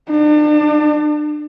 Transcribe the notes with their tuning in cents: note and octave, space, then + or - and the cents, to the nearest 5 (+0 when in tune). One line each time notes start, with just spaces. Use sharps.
D4 +35